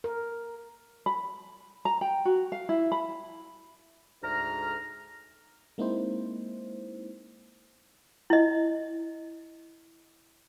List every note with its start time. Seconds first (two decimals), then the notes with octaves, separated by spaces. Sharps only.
0.04 A#4
1.06 B5
1.85 A#5
2.01 G5
2.25 F#4
2.52 F5
2.69 E4
2.92 B5
4.22 D2 G#2 A#5 F6
5.78 G#3 A#3 C4 D#4 E4 C5
8.30 E4 D#5